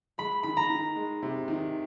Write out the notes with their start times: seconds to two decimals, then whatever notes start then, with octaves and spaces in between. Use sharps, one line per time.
0.18 G#3 B5
0.43 D#3 B5
0.57 A#5
0.70 D#3
0.96 G#3
1.23 C3
1.48 D#3